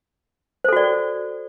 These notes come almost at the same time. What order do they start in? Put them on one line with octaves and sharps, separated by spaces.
C5 A4 F#4 D5